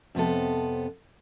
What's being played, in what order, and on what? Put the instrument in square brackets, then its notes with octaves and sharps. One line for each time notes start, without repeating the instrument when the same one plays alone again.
[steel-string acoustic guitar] F2 C3 B3 A4